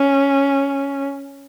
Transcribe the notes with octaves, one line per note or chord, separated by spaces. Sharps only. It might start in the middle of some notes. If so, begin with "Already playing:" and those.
Already playing: C#4